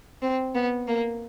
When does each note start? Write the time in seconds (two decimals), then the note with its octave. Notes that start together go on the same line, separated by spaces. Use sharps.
0.22 C4
0.55 B3
0.88 A#3